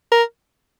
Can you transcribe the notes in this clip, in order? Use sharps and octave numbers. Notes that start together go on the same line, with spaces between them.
A#4